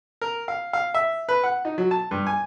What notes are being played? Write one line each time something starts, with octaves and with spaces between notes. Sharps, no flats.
A#4
F5
F5
E5
B4
F#5
D#4
F#3
A5
G2
G#5